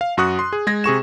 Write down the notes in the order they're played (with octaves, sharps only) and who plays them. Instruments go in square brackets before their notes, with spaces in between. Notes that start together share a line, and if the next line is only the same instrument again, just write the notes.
[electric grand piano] F5
F#2 F#4 C#6 D#6 F#6
C6
G#4
G#3 G#6 A#6
C3 G#4 C#6 E7